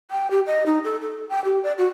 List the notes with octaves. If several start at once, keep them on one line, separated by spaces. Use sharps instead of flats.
G5
G4
D#5
D#4
A4
A4
G5
G4
D5
F#4